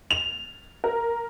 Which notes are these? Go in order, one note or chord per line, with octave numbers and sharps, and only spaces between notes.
F7
A#4